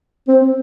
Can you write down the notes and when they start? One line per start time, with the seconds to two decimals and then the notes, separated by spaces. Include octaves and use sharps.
0.28 C4